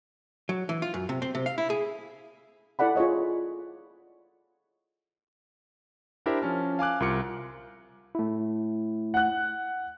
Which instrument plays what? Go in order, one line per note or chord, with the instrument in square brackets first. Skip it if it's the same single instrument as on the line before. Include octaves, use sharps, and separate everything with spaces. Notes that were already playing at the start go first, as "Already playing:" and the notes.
[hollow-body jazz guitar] F#3
E3
F4
F#2
C3
C4
C3
F5
E4
G#4
[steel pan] E4 A4 D5 F#5 B5
F4 G#4 C#5 D#5
[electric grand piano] D4 E4 G4 A#4 C5 E5
F3 C#4 A5 F6
F5 G#5 D6 F#6
C2 F4 A#4 D6 C#7
[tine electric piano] A3 E4
[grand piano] F#5 F#6